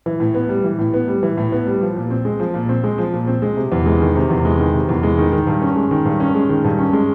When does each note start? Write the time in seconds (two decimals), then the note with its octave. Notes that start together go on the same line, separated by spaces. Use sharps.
0.06 E3
0.20 A2
0.34 B3
0.49 G3
0.64 E3
0.79 A2
0.94 B3
1.08 G3
1.23 E3
1.37 A2
1.52 B3
1.67 G3
1.81 F3
1.96 A#2
2.10 C4
2.25 G#3
2.40 F3
2.54 A#2
2.69 C4
2.84 G#3
2.98 F3
3.13 A#2
3.28 C4
3.42 G#3
3.57 C3
3.72 E2
3.86 G#3
4.01 D#3
4.15 C3
4.30 E2
4.45 G#3
4.59 D#3
4.74 C3
4.89 E2
5.03 G#3
5.18 D#3
5.32 D#3
5.47 G2
5.62 C#4
5.76 G#3
5.91 D#3
6.05 G2
6.20 C#4
6.35 G#3
6.49 D#3
6.64 G2
6.79 C#4
6.93 G#3